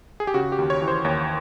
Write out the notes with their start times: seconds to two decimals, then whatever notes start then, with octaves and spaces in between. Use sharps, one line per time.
0.20 G#4
0.27 G4
0.34 C#3 F#4
0.52 G4
0.59 D#2
0.70 C#5
0.82 E3
0.88 C5
1.05 D#2 C#5